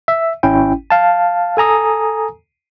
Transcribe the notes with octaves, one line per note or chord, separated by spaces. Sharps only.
E5
G#1 C#4 E4 G5
F5 A5
A4 G#5 A#5 D#6